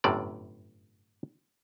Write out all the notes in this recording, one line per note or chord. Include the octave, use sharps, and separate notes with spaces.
G1 F#2 A2 C3 D5